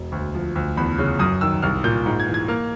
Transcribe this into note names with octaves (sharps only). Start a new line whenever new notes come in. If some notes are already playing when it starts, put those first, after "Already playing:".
Already playing: E1
D2
F3
D2
E2 B5
C#3
F#2 D#6
D#3 E6
C2 F6
A#2 G6
G#2
G#6
E3
G#6
A#3 F6